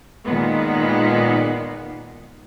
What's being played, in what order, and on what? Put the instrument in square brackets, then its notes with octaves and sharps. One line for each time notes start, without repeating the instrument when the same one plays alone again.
[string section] A#2 D#3 G#3 B3